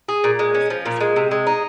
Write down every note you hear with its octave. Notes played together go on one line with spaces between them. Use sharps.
G#4
A#2
G#3
C#4
F3
A#2
G#3
C3
G#3
D#4